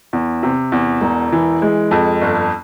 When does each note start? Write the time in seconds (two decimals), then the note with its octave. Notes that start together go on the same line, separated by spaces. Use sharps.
0.13 E2
0.43 C3
0.72 E2
1.01 E1
1.32 E3
1.62 G#3
1.91 F2
2.21 G1